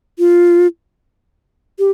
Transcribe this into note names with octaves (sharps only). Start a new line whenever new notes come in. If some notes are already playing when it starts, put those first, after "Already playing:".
F4
G4